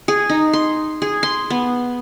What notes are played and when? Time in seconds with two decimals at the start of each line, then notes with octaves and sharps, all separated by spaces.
0.08 G#4
0.29 D#4
0.53 C6
1.02 G#4
1.23 C6
1.50 B3